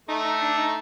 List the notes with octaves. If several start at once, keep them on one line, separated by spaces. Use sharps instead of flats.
A3 D#4
D#4
D4
D#4